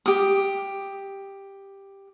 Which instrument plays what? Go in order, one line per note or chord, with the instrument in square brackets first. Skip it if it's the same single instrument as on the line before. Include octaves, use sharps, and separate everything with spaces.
[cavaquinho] G4 D#6